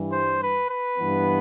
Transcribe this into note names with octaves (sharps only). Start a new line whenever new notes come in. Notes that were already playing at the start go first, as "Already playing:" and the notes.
Already playing: G2 E3 G3
C5
B4
B4
G2 E3 B3